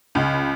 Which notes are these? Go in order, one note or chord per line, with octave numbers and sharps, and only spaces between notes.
C#2